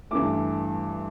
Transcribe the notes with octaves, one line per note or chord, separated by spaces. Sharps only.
G2 E3 A3 D6